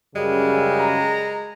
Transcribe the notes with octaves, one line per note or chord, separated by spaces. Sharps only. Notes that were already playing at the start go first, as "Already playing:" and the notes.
F#2 C#3 G3 G#3
A#5